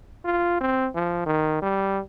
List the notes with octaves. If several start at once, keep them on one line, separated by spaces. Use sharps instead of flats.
F4
C4
F3
D#3
G3